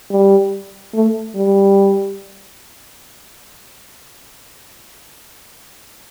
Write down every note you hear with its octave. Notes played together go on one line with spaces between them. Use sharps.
G3
A3
G3